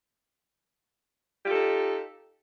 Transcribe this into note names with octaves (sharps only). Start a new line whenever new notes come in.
D#4 F4 G4 A4